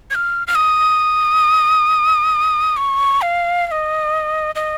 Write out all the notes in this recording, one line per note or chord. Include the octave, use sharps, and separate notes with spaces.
G#6
F6
F6
D#6
C#6
F5
F5
D#5
D#5